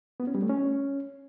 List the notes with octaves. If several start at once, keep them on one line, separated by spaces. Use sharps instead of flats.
B3
C#4
G3
A3
C#4